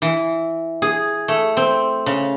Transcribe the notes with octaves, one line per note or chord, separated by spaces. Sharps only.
E3
G#4
A3
C4
C#3